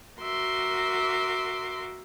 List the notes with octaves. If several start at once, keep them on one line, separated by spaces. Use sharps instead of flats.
F#4 A#4 E5 C6 D6